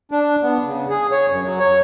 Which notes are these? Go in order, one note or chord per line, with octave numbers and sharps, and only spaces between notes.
D4
B3
C#3
G#4
C#5
F#2
F#3
C#5